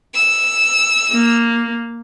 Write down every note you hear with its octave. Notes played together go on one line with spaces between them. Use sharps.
E6
A#3